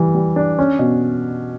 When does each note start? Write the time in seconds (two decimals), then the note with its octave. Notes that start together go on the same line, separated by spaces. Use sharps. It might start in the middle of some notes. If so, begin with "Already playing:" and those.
Already playing: E3 G3
0.14 G3
0.36 D4
0.59 C#4
0.79 B2